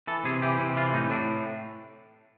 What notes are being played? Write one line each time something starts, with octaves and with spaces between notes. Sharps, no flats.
E3 A4
C3 G#4
E3 G4
C3
E3 F4
A2 D#4
A2 D4